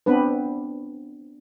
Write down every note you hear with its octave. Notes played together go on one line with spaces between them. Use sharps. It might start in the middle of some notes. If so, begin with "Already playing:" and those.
B3 C4 D4 B4